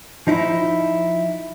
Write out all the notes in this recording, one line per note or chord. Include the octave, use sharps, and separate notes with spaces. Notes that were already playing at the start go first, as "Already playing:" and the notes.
F3 D#4 E4